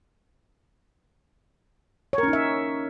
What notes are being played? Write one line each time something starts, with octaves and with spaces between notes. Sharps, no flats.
C#5
A#4
C#4
D#4
E5